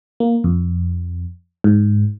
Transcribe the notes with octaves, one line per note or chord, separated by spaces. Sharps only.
A#3
F2
G#2